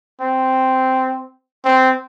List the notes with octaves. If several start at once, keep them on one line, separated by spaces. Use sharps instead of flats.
C4
C4